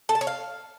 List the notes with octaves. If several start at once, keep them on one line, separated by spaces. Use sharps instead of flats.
A4
A5
C#5
F5